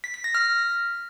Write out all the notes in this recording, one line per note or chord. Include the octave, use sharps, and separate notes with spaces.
B6
B6
A#6
F6